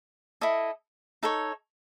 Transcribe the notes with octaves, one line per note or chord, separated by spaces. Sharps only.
E4 A4 D#5
D#4 A4 C#5